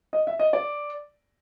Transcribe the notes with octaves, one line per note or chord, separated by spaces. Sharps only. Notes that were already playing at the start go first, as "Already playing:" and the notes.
D#5
E5
D#5
D5